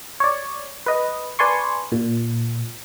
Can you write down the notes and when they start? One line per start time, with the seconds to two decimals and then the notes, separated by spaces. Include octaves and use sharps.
0.20 C#5 D5
0.86 B4 D#5
1.39 B4 D5 G#5 A5 C6 C#6
1.92 A#2